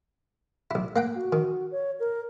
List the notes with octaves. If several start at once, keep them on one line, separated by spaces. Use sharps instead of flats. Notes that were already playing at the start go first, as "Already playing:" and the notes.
B1 E4
A#3 F#5 G5
F#4
D#3
C#5
A#4